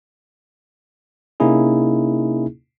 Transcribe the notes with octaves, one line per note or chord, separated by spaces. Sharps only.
C3 A#3 C#4 D#4 E4 G#4